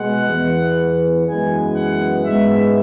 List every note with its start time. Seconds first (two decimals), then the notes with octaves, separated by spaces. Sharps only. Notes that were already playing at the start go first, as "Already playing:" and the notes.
Already playing: B2 G#3 B3 F#5
0.28 E2 E3 B3
1.27 F#2 E3 G#3 B3 G#5
1.76 F#5
2.24 G#2 G#3 B3 E5